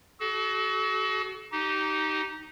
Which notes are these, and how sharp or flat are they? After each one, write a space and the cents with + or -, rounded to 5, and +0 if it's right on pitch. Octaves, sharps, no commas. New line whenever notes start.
F#4 +30 A4 -40
D#4 +0 G4 -25